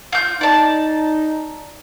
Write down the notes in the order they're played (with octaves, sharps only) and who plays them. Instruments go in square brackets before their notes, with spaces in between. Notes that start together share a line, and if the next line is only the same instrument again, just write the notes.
[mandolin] F4 G6
[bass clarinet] D#4 [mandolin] D5 A5